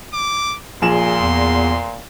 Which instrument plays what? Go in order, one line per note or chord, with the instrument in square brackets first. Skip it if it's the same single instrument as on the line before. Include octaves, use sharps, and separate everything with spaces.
[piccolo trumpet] D6
[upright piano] A#1 G#4 E7 [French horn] A#2 [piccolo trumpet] C6
[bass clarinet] E2